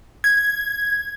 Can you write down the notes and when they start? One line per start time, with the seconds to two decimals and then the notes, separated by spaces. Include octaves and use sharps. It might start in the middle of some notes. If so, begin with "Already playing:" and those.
0.24 G#6